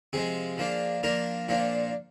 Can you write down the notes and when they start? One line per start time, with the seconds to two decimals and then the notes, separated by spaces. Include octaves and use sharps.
0.13 C3 F3 G#3 G#4
0.58 F3 A#3 D4
1.03 F3 A#3 D4 A#4
1.48 A#2 F3 A#3 D4